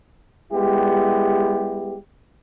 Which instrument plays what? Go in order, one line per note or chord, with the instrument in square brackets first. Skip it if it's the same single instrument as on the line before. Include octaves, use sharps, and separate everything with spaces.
[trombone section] G3 G#3 B3 E4 G4